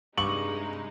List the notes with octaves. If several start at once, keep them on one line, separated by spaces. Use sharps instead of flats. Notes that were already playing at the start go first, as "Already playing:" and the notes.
G2 C3 G#3 D#4 C#6 D6 F#7